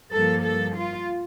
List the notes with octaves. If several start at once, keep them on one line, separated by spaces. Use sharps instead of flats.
G2 F3 A#3 A4
A4
F4